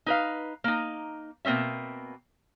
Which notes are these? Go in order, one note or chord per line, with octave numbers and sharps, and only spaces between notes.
D#4 B4 F5
A#3 D#4
B2 A#3 C4 C#4 E5